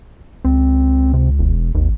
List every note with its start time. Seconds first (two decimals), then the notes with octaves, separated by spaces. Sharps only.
0.45 C#2 C4
1.14 C3
1.39 E1
1.75 G#1 D#2